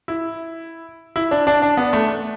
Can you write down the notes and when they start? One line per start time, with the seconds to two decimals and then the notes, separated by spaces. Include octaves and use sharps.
0.08 E4
1.16 E4
1.31 D4
1.47 D4
1.62 D4
1.77 B3
1.93 A3